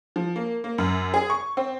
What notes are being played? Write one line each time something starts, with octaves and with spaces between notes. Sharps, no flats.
F3
A#3
A#3
F#2
G#4
C#6
C4